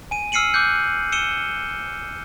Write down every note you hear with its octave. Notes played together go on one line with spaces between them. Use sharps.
G#5 D#7
E6 F6 C7 C#7 D#7 F#7
D6 E6 F#6 G6 C#7
E6 C#7 D#7 E7 G7